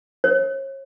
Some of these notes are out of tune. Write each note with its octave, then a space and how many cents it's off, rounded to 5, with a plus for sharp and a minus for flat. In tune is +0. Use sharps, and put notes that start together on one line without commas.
C#5 -35